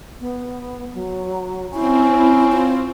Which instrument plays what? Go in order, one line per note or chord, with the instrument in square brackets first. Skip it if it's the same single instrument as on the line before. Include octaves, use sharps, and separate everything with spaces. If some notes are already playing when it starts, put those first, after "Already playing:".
[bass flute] B3
F#3
[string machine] C4 [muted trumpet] C#4 [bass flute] E4
[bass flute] F4